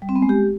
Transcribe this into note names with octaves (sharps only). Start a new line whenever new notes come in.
G3
C4
B3
G#3
G4